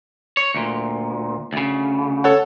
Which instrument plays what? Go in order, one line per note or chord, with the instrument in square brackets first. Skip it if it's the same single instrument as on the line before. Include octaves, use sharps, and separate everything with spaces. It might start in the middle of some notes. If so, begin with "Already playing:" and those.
[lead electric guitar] C#5
D2 A#2
D2 C#3
[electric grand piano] A4 C#5 F#5